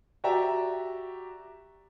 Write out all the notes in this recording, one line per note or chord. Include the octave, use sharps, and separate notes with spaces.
F#4 G4 D5 E5 A#5